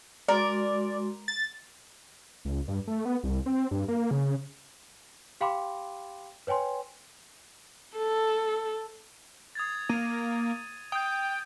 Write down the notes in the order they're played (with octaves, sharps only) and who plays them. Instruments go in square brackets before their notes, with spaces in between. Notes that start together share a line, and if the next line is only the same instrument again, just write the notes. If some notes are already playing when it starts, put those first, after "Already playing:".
[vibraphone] G#3 F#4 C6 [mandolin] A#4 [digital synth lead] D5
[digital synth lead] A6
[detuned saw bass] C#2
G2
A3
B3
C2
C4
G2
A#3
C#3
[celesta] G4 F5 G5 B5 C6 D6
B4 C#5 G5 G#5 C6
[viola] A4
[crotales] D#6 G#6 A6
[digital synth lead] A#3 [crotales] D#7
[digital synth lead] G5 [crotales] D#6 G6